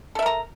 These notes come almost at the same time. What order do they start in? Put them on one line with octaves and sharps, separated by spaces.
A4 E5 A#4 A#5